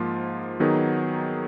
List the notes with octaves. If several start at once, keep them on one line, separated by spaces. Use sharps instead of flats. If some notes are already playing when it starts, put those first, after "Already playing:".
Already playing: G#2 F3 A#3 F4
D#3 F#3 B3 D#4 G#4